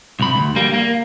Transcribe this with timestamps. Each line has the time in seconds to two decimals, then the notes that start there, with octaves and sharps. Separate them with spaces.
0.20 C2 B5
0.35 D2
0.56 G3 A#3
0.73 A#3